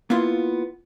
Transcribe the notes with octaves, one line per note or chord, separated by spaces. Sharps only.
A#3 B3 E4 F4 C6